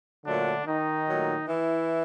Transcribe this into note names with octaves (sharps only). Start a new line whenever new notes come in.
A#2 D3 F#3 A3 D4
D#3 D#4
A#2 F#3 A3
E3 E4